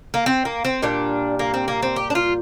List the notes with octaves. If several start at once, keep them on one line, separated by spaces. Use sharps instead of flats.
A#3
C4
A#3
C4
A#2 G3 D4
A#3
C4
A#3
C4
G4
D4
F4